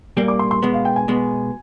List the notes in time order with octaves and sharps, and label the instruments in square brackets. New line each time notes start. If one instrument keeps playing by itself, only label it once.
[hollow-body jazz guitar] A#2 G3 A#3
[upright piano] D6
C6
C6
[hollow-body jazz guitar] B2 G#3 B3
[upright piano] F5
G5
G#5
[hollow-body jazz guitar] B2 G#3 B3